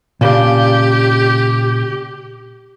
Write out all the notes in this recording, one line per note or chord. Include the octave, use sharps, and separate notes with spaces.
A#2 C#3 D4 G4